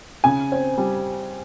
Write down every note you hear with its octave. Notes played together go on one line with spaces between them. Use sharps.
C#3 G#5
C4
G3